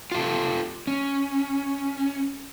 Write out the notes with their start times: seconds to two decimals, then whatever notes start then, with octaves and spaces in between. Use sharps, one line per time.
0.12 F4 G4 A4
0.87 C#4